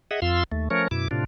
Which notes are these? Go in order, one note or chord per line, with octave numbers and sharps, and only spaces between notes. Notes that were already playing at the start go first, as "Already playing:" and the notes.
G#4 D#5 E5 F#5
F2 F4 F5 C6 E6
D#2 A3
F3 A3 C#4 A#4 C#5
F#2 B2 E4 D6
A2 C3 D4 F4